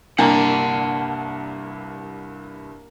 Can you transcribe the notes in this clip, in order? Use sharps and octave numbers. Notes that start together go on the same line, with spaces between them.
C2 G2 A#3 D4 F#5 A5 A#5